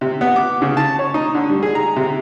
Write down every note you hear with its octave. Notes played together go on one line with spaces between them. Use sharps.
C3
B3
D6
C#3
A5
C#5
D#4
D3
G3
G#4
A#5
C3